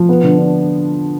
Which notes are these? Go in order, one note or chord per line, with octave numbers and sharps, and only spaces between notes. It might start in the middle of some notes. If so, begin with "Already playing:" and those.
Already playing: F3
B3
D3
D4